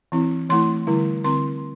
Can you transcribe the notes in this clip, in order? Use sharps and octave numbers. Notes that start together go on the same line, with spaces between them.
E3 C4 E4
E3 A3 E4 C6
D3 G3 E4
D3 C4 E4 C6